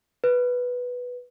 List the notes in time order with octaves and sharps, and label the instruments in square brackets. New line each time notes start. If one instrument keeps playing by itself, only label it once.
[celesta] B4